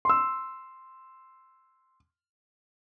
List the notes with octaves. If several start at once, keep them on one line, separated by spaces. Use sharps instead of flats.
C6 E6